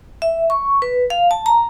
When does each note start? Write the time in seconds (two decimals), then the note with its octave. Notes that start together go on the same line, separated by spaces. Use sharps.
0.22 E5
0.50 C#6
0.82 B4
1.10 F5
1.31 A5
1.46 A#5